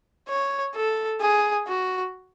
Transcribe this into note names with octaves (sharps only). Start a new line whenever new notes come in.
C#5
A4
G#4
F#4